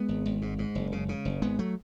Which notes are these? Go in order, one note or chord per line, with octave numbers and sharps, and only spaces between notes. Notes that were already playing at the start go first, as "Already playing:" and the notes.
Already playing: G#3 B3
G#1
G#1
G#2
G#2
F#1
C#3
C#3
F#1
G#1 G#3 B3
F#3 A3